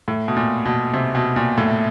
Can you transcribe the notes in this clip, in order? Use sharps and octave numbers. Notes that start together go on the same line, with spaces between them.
A2
B2
A#2
B2
C3
B2
A#2
A2